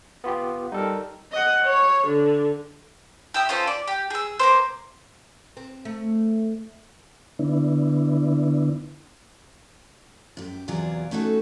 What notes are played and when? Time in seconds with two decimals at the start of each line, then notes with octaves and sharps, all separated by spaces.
0.24 B3 F4 G4
0.72 G3 D#4 A4 A#4
1.32 D#5 F#5
1.65 C#5
2.07 D3
3.34 G4 E5 D#6
3.49 C#4 F4 A4 C5
3.67 D5
3.88 G4
4.10 G#4 E6
4.40 A#3 B3 C5
5.57 C4
5.85 A3
7.39 D3 B3 D4 E4
10.37 F#2 G4
10.68 E2 C3 F#3 F4 G#4 D5
11.11 A3 C#4 D#4 F#4 A4